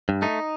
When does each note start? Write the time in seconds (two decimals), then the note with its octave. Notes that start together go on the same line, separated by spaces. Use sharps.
0.09 G2
0.22 A3 D#4